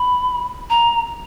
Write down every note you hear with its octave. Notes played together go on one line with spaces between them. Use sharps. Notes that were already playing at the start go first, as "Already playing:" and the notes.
Already playing: B5
A#5